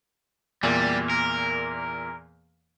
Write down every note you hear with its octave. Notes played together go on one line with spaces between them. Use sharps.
E2 A#2 G3 A#3
A#4